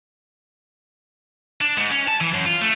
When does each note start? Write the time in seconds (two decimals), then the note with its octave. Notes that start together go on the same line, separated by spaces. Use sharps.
1.61 D4
1.78 G#2
1.91 C#4
2.08 A5
2.21 E3
2.34 F#2
2.46 F4
2.61 A3